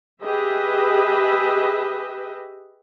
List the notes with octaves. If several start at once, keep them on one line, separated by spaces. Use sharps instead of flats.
G4 G#4 B4 D#5 E5